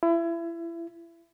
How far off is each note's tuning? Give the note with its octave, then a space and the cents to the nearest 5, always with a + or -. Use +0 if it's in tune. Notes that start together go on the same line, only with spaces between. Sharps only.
E4 +30